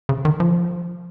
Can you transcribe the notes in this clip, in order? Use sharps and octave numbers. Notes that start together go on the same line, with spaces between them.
C#3
D#3
F3